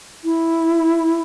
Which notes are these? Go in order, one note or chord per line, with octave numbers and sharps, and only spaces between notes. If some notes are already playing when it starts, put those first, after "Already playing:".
E4